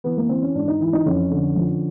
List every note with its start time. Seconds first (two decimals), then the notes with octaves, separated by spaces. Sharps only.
0.04 E3 B3
0.17 A#3
0.29 E3 C4
0.42 C#4
0.55 G#2 D4
0.68 D#4
0.80 E3 E4
0.93 D#4
1.06 F2 C#4
1.31 D3
1.56 F3